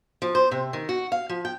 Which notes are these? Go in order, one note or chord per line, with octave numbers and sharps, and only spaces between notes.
F3
C5
C3
D#3
F#4
F5
F3
G5